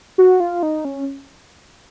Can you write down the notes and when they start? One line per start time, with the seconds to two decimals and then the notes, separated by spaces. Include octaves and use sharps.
0.18 F#4
0.40 F4
0.63 D#4
0.85 C#4